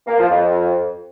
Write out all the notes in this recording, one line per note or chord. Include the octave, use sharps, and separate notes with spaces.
A#3
F3
F2